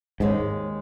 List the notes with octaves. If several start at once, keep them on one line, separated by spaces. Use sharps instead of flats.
D#2 G#2 D#3 G#3 C#4